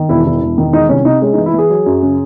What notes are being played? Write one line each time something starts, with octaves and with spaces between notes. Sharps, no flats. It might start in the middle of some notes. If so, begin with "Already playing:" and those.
Already playing: D#3
E1 E4
E1 E4
E1
D#3
G#3 D#4
C2 C#4
C3 D#4
G#3 C#4
D#4
E3
E4
E3 G#4
F#3
F#2
C#3